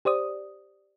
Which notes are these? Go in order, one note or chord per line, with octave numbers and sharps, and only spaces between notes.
G4 C5 D5 D#6